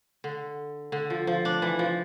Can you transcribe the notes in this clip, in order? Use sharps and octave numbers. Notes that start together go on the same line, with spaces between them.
D3
D3
F3
F3
D4
E3
F3